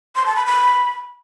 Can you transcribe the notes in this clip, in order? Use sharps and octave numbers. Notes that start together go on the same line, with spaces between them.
C6
A5
B5
B5